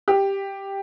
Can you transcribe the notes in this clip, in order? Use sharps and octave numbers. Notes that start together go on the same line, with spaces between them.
G4